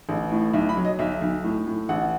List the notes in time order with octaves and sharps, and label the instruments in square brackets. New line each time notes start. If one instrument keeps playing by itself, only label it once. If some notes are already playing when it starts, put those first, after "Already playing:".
[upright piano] A1
A2
B1 E5
B5
F#3
D#5
B1 E5
B1
A2
A2
A1 F#5